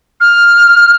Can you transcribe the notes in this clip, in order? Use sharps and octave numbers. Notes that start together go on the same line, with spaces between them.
F6